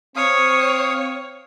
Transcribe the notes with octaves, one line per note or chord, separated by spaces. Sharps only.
C4 C#5 F5 D#6